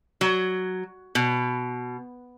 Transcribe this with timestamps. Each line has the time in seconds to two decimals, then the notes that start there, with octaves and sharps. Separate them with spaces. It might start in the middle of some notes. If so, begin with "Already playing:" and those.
0.21 F#3
1.15 B2